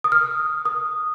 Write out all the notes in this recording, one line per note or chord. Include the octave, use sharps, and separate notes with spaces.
D#6
F6
D#6